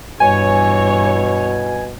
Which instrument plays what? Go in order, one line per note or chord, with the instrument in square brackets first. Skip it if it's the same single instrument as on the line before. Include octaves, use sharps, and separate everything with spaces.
[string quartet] G2 E3 [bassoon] B2 [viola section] C#5 [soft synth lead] G#5